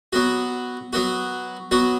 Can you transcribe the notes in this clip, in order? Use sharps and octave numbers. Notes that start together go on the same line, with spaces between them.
F#3 B3 F#4
F#3 B3 F#4
F#3 B3 F#4